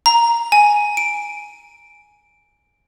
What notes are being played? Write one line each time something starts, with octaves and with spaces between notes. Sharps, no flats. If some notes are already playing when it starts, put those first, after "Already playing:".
A#5
G#5
D7